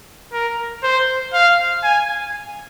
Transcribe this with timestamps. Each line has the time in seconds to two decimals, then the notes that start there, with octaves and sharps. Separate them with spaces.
0.33 A#4
0.83 C5
1.34 F5
1.84 G#5